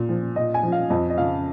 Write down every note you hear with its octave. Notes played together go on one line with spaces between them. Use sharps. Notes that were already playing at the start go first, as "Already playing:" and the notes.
Already playing: A#2
F3
A#2 D#5
G#5
F3
F5
F2 D#5
D#5
C#3 F3 F5